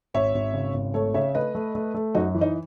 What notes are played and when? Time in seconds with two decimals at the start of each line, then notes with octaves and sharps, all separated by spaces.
0.14 G#1 C#5 E5
0.34 G#1
0.54 C#3
0.74 G#1
0.94 A3 A4 C#5
1.14 C#3 C#5 E5
1.35 A3 B4 D#5
1.55 A3
1.75 A3
1.94 A3
2.15 F#2 D#4 F#4
2.35 E3
2.41 D#4